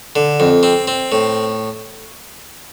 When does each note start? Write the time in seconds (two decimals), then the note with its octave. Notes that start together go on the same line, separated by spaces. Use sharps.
0.16 D3
0.40 F2
0.63 C4
0.87 C4
1.12 A2